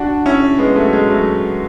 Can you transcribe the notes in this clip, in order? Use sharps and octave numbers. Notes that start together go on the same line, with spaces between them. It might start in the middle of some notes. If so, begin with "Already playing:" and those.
Already playing: D4 F#4
C#4 E4
G#3 B3
F#3 A3
G#3
F#3 A3